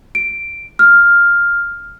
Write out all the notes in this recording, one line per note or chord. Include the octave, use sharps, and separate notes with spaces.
D7
F6